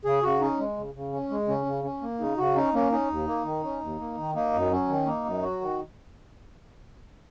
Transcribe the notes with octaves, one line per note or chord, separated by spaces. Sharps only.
C#3 G#4
C#3 F#4
C#4 D#4
G#3
C#3
C#3
C#4
G#3
C#3 C#4
C#3
C#4
A#3
C#3 D#4
C#3 F#4
C#4 D#4
A#3 C#4
C#4 D#4
D#2
A#3
D#3
C#4
D#2
A#3
D#3
A#3 D#4
F#2
F#3 C#4
D#3
A#3 D#4
F#2
F#3 F#4
D#3